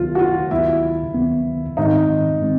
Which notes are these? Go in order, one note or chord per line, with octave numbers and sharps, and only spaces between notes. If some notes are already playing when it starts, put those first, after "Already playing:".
Already playing: D2 C3 D#3 F#3 B3 F4
F#4
F4
D2 C3 D#3 F#3 B3 E4
D2 C3 D#3 F#3 B3
G#2 D#3 G#3 C4 D#4
D#3 G#3 C4